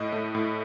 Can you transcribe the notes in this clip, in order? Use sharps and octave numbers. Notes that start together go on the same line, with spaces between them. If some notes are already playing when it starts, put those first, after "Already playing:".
Already playing: A2 D#5
A3
A2